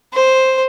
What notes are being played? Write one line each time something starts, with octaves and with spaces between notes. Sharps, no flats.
C5